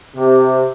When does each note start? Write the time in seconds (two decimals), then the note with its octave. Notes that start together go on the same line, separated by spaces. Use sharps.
0.16 C3